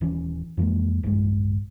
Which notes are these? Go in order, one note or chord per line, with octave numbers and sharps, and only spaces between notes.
D#1 E3 C#4
F2 E3 G#3 A#3
D1 A#1 G2 G#3